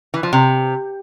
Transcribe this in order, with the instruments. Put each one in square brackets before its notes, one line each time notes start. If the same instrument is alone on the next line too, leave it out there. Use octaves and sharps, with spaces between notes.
[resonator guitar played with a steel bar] E3
F3
C3